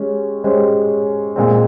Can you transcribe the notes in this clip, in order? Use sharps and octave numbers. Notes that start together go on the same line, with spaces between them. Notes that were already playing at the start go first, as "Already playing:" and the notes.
Already playing: G#3 C#4 G4
G#3 C#4 G4 C5
A#2 G#3 C4